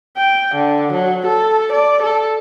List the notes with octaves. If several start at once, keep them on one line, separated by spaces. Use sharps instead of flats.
G5
D3
F#3
A4
D5
A4